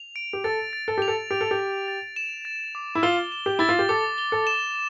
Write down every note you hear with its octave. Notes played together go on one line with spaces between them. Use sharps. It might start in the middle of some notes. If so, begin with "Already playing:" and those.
Already playing: F7
D7
G4
A4 A6
A6
A4
G4 F7
A4
G4 D7
A4
G4
A6
A6
E7
A6
D6
E4
F4 G7
E7
G4
E4 A6
F4
G4
A4 D6
G7
A4
E7